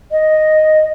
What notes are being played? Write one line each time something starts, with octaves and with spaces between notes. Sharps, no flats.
D#5